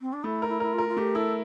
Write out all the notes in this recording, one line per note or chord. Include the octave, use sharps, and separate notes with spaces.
C4
D4
A3 E4
A#4
E4
E4 A#4
F4
A#4
F4
A3 G4
E4 A4